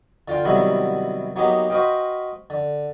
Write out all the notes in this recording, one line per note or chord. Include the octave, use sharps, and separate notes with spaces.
D3 F4 F5 G5
C3 D#3 F#3 G3 B3 E4
F#3 A#3 B3 D#4 G4
F#4 B4 C5 D#5 F5 G5
D3